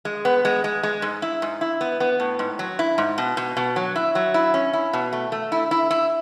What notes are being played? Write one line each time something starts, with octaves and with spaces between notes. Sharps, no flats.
G#3
B3
G#3
G#3
G#3
G#2
E4
G#2
E4
B3
B3
A2
G#2
F#3
E4
G#2
B2
B2
B2
F#3
E4
F#3
E4
C#4
E4
B2
A3
A3
E4
E4
E4